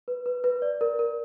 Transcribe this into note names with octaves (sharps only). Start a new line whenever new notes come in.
B4
B4
B4
D5
A#4
A#4